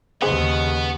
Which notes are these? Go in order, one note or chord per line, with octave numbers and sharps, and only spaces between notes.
D#2 C#3 B3 D#4 G#4 C5 D#5